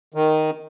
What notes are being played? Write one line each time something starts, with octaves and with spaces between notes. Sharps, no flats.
D#3